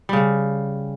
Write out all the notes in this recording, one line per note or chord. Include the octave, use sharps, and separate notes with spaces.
C#3 G3